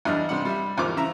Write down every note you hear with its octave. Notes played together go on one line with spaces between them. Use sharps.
E2 G3 D4 D#5 F6
C3 G3 D4 F#5
G3 E5
G#1 E2 D#3 F3 D6
C#3 E4 E5 A#5